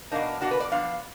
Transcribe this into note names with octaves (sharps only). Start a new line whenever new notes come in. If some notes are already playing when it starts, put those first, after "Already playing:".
B2 A#3 D4 D#4
B2 A#3 D4 F#4
B4
D5
F3 B3 D4 F5